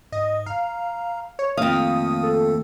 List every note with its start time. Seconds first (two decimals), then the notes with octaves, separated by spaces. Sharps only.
0.12 G#2 D#5
0.46 F5 A#5
1.39 C#5
1.57 F2 D#3 A3 A#3 F5 D#6
2.23 A4